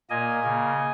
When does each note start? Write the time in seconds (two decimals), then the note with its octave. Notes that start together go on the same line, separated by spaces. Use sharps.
0.10 A#2 A#3 D#5 G#5
0.43 C#3 A#3